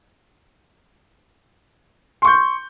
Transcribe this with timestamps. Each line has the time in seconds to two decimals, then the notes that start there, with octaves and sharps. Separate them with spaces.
2.22 C6
2.25 C#6
2.27 G6